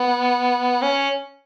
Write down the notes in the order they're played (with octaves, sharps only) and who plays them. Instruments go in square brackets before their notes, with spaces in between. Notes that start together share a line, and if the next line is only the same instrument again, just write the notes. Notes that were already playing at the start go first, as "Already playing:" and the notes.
Already playing: [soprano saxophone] B3
C#4